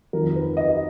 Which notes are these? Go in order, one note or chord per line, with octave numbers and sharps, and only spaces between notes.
F2 D#3 A#4
B4
D#5